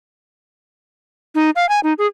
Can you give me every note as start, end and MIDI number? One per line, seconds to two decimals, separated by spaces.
1.35 1.50 63
1.56 1.68 77
1.69 1.80 80
1.83 1.93 63
1.98 2.07 68